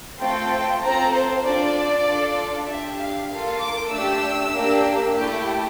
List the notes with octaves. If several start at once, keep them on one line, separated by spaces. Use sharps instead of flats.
A3 C4 F4 A4 G5
C4 F4 A4 A#5
C5
D4 F4 A4 D5
D4 F4 A4
D4 G4 E5
F5
A#3 F4 A4 F5
D6
A3 D4 G4 E6
A#3 D4 G4
A3 E4 G4 G5